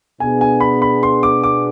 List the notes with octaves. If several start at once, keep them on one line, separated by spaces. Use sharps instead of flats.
B2 B3 D4 G#4 G#5
G#5
B5
B5
C6
D6
D6